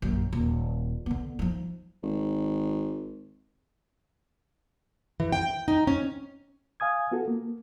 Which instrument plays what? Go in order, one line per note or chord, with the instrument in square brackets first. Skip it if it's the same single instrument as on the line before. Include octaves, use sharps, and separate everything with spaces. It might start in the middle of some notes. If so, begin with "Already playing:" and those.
[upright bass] A#1 F#2
D#1
D3 B3
F3 D#4
[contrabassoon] G#1
[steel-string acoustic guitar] E3
G5
D#4
C#4
[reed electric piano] F5 G#5 D#6 G#6
B3 F4 F#4 A4
A#3